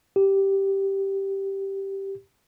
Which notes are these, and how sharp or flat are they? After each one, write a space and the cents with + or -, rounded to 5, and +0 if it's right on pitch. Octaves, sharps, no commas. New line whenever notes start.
G4 -5